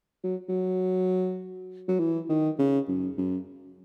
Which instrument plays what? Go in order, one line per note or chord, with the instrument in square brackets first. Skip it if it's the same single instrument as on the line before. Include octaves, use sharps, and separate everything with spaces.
[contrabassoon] F#3
F#3
F#3
E3
D#3
C#3
F#2
F#2